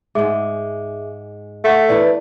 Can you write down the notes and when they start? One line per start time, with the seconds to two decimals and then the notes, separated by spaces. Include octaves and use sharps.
0.15 G#2 G#3 G#4 E5 D6
1.64 A3 E5 F#5 C#6
1.89 E3 B3 D4 E4 D5